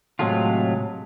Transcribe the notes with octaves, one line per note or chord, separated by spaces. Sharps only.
A2 C3 F#3 G#3 A3 F4